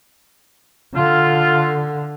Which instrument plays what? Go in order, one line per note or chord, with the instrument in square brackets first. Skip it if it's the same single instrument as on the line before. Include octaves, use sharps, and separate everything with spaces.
[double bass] D3 [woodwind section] F4